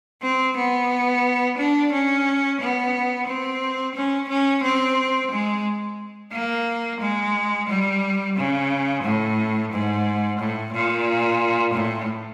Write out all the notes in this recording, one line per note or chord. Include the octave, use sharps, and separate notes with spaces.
C4
B3
D4
C#4
B3
C4
C#4
C#4
C4
G#3
A#3
G#3
G3
C#3
A2
G#2
A2
A#2
A2